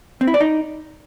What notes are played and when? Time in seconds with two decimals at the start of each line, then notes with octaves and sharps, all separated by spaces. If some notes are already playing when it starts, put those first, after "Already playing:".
0.21 C4
0.27 E4
0.34 D5
0.41 D#4